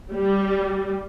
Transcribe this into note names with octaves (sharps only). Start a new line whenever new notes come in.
G3